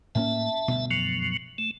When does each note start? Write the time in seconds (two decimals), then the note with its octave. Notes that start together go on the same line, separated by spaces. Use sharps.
0.15 A2 A#3 C#4 E5 A5
0.68 D2 G2 B2
0.91 F#2 F3 F#3
1.58 A3